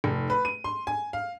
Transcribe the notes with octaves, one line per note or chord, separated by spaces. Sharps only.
F1
B4
D#7
C6
G#5
F5